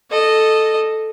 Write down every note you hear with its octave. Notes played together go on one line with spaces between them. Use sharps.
A4 D#5